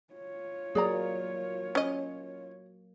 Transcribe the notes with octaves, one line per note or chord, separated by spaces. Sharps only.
F4 C#5
F#3 A#3 G#4 D5 A#5
C#4 D#5